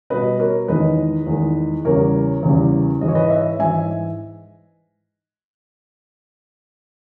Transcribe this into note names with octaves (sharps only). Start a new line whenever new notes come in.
B2 G3 B4 D#5
A#4 C#5
E2 D#3 G#3 B4 D#5
E2 D#3 G#3
E2 C#3 G3 A#4 C#5
E2 C#3 G3
G#2 E3 G#3 D#5
C#5
B4 D#5
C#5 E5
G#2 E3 G#3 E5 G#5